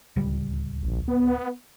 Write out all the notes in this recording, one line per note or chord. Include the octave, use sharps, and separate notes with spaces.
D1 C#2 G3
A#1
B3